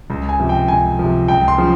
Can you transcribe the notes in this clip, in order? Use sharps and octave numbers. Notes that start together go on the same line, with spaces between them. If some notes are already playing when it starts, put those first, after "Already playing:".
C#2
G#5
C3 F3
G5
C#2 G#5
C3 F3
C#2 G5
C6
C#3 F3